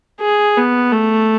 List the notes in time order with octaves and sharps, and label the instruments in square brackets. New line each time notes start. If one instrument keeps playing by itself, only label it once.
[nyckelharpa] G#4
B3
A3